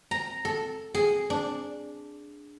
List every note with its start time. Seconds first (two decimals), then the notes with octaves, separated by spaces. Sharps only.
0.11 A#5
0.45 A4
0.94 G#4
1.30 D4